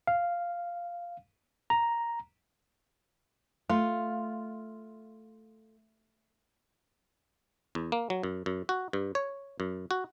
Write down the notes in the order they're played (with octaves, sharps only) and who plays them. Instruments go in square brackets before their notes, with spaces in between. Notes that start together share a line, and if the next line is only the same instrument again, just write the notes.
[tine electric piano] F5
A#5
[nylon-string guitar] A3 [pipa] F4
[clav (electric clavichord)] E2
A#3
F#3
F#2
F#2
F#4
G2
C#5
F#2
F#4